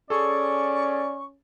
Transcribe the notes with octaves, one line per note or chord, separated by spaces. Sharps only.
C#4 G#4 A4 D5 C#6